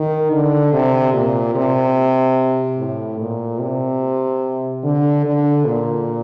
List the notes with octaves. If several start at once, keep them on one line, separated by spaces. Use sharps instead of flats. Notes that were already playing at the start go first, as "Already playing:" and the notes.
Already playing: D#3
D3
C3
A#2
C3
A2
A#2
C3
D3
D3
A#2